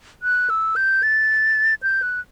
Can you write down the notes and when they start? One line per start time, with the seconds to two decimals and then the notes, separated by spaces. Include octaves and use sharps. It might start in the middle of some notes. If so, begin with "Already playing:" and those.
0.23 F#6
0.50 E6
0.76 G6
1.03 A6
1.83 G6
2.02 F#6